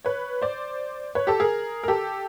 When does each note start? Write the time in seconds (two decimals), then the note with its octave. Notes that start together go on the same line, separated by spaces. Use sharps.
0.05 B4 C#5
0.42 C5 D5
1.15 B4 C#5
1.27 G4 A4
1.40 G#4 A#4
1.83 A#4
1.88 G4 A4